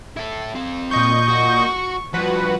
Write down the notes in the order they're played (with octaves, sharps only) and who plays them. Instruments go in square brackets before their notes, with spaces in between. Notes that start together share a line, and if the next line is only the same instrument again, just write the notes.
[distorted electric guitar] E4 A4
C4 F5
[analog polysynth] A#2 D#5 G6 [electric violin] C#6
[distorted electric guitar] F#4
[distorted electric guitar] G2 F3 [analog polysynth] F#4 B4 F#5